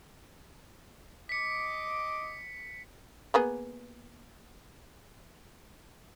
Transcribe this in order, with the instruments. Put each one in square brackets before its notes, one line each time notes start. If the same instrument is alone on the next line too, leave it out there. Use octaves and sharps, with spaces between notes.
[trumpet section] D#5 D6 [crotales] B6 C#7
[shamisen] A#3 B3 G#4